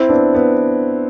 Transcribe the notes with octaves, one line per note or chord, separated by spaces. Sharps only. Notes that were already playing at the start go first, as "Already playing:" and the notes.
Already playing: C4 E4
B3 D4
B3